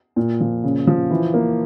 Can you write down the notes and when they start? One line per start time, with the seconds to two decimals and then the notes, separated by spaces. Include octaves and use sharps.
0.16 A#2
0.41 F3
0.64 C#3
0.87 F3
1.11 E3
1.34 A#3